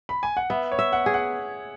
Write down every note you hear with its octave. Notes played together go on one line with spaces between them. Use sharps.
B5
G#5
F#5
B3 E5
C#5
E5
F#5
G#4
F#5